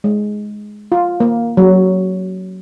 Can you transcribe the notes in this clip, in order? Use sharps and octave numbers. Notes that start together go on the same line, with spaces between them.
G#3
F4
A#3
F#3